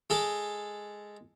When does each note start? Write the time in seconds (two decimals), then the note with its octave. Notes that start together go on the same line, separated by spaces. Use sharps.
0.10 G#3 A4